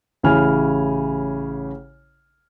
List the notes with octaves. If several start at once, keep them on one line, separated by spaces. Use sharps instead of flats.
A1 C#3 C#4 E4 G#5 F6